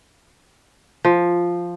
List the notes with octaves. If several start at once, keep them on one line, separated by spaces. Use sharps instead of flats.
F3